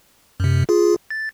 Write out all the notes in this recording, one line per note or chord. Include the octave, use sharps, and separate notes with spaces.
F#2 C3
F4 G#4
A6